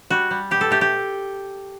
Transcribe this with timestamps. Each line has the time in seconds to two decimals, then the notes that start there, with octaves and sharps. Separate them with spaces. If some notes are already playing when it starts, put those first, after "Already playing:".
0.10 G3 F#4
0.31 G3
0.51 B2 G4
0.61 A4
0.71 A3 G4
0.81 G4